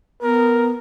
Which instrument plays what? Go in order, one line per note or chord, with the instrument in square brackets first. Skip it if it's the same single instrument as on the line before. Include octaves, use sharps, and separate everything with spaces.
[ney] B3 [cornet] A#4